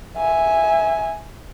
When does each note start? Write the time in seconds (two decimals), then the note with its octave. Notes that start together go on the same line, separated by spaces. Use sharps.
0.17 E5 G#5